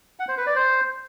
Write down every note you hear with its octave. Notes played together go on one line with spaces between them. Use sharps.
F#5
C5
B4
D5
C5